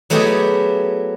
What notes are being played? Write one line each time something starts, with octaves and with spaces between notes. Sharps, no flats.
F#3 A3 B3 E4 G4 G#4